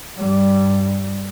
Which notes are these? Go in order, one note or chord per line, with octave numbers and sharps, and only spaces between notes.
G2 G3